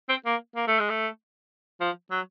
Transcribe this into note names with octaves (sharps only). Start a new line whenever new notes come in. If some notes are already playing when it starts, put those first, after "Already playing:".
C4
A#3
A#3
A3
G#3
A3
F3
F#3